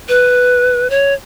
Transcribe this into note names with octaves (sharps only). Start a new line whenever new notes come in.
B4
C#5